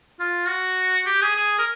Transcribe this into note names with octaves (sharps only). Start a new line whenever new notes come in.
F4
F#4
G4
G#4
G#4
A#4